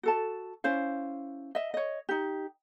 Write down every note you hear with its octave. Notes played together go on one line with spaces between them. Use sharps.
F#4 A4 A5
C#4 E4 C5 F5
D#5 E5
C#5 D#5
D#4 G4